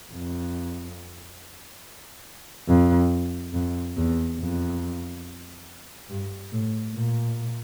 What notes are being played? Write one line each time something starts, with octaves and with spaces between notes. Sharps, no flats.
F2
F2
F2
E2
F2
G2
A2
A#2